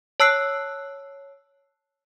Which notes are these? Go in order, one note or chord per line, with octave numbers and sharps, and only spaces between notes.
C#5 A5 E6 F#6 C7